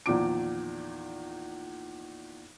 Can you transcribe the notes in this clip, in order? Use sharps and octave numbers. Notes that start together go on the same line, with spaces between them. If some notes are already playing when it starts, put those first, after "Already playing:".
E2 A#2 D#3 F3 D6 D7